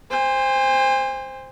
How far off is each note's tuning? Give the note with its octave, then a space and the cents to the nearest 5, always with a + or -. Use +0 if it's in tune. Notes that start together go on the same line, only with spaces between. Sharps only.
C5 +0 G#5 -45